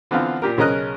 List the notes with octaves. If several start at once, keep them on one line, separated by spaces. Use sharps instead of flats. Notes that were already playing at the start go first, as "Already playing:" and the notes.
D3 E3 B3 C4 F4
A#2 G4 A#4
B1 C#3 C#4 A#4 D#5 F#6